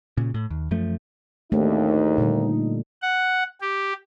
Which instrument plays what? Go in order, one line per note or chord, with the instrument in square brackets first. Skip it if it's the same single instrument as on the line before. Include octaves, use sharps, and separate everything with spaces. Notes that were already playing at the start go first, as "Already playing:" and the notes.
[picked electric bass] A#2 C#3
A2
D#2
F#2 F3 A3
[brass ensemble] G#1 D#2 [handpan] A3 D4 [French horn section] D#4
[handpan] A#2 D3 G3
[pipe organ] F#5
G4